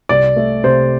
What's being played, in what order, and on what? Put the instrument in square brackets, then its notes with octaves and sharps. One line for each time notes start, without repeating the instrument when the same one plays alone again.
[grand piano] C2 D5
A3
C3 C5